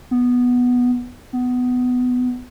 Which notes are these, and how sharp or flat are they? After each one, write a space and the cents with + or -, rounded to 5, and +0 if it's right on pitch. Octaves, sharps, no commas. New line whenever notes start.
B3 -5
B3 +15